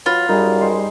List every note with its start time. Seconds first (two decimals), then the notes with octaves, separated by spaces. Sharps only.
0.06 F#3 F4 B4
0.29 F#2 G3 D#4 G#4
0.61 G#3 C5